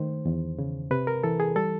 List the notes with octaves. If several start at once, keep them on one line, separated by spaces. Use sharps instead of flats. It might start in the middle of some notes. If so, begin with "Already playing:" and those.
Already playing: D#3 A3 C5
E2
C#3
C3 B4
A#4
E3 A4
G#4
G3 A4